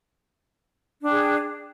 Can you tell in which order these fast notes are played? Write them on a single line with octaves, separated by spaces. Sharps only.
D4 G5 G#4